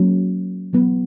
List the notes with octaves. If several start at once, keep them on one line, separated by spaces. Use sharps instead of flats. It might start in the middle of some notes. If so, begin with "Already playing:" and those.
Already playing: F#3 A#3 C#4
F#3 B3